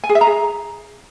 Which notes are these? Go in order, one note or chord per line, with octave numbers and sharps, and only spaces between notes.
G#5
G#4
E5
A#5
G#4